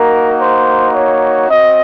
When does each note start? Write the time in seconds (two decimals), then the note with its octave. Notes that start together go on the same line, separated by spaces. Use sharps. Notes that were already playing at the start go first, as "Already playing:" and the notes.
Already playing: A#3 D#4 F#4 A#4
0.41 C5
0.95 C#5
1.49 C4 F#4 D#5